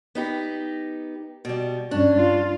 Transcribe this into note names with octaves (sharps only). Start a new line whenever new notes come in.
B3 D#4 G4
B2 G3
G2 C#4 D4
F4